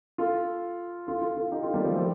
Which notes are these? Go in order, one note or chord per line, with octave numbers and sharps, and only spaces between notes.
F4 A4
F4 A4
F4 A4
F4 A4
D#4 G4
F4 A4
G3 A#3
F3 A3
G3